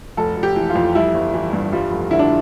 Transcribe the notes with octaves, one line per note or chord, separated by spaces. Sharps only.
F1 A4
F1
G4
E3
F4
F2
G3 E4
G1
E3
G2
G3 F4
F1
D3 E4
D4